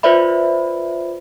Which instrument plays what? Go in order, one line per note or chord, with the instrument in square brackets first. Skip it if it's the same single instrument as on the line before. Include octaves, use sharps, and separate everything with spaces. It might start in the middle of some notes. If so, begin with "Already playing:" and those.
[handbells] F4 B4 C5 D5 E5 B5